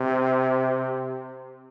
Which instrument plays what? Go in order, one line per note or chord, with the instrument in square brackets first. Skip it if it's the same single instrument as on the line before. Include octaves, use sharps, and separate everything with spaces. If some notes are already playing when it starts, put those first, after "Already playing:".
Already playing: [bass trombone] C3